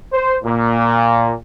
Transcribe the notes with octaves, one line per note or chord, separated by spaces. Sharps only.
C5
A#2